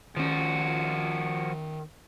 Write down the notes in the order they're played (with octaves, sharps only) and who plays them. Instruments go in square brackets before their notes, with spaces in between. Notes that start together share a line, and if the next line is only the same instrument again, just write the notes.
[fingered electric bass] D#3 C#4 [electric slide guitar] F3 F#4